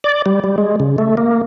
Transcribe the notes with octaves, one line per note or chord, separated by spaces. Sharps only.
D5
G3
G3
G#3
C#3
A3
A#3